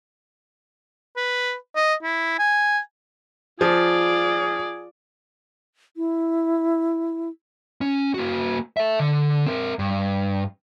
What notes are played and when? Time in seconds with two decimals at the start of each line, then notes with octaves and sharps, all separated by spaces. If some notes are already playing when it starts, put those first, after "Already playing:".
1.16 B4
1.76 D#5
2.03 E4
2.39 G#5
3.61 F3 F4 G#4 D5
5.97 E4
7.81 C#4
8.14 A#3 F#4
8.77 A4 E5
9.00 D3
9.46 C4 A#4
9.79 G2